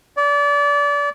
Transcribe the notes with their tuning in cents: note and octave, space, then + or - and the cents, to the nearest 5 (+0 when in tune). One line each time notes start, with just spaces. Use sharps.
D5 -30